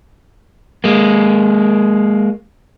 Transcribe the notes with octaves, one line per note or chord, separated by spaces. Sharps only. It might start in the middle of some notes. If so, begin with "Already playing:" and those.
G#3 A#3